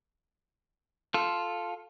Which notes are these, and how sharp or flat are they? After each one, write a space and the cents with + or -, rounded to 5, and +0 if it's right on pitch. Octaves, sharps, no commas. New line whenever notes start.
F4 +0 A4 -5